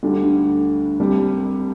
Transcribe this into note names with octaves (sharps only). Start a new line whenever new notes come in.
D2 D3 G3
C2 C3 G3